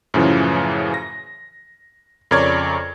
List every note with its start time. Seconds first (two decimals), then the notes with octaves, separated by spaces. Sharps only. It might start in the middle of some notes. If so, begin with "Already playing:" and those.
0.14 F#2 A2 C#3 E3 F3
0.94 A#6
2.31 F2 C#3 A#4 C#5 D5 G#6